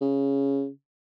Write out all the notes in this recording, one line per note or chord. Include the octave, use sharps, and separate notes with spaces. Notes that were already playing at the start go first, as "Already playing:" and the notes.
C#3